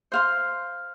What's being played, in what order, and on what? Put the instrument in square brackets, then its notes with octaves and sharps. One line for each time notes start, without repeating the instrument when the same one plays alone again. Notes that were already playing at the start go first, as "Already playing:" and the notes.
[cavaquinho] C5 F5 C6